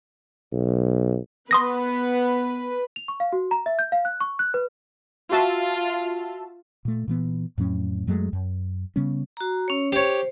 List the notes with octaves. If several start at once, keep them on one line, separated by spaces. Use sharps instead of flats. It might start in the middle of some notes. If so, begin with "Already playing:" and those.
B1
B3 B4 C6 D#6 A#6
F7
C#6
F5
F#4
A#5
E5
G6
F5
F#6
C#6
F#6
B4
F4 F#4 E5 A5
A#2 A3
A#2 E3 B3
F2 A2 F#3 C#4
F#2 F#3 G#3 A3
F#2
C#3 G3 B3 C#4
F#4 A#5
C#4 C#5
G4 C5 C#5